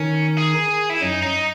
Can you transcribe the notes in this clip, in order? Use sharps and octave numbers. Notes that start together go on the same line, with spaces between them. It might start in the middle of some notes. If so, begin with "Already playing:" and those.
Already playing: D#3 C#4 D#4
G#4
E4
F#2 F#3 D#4
D#4